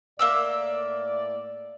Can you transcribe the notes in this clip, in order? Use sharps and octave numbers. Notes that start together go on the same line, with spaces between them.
A2 A#3 D5 E5 E6